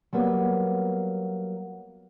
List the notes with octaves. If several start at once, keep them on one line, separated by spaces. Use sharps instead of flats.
F#3 G3 A#3 B3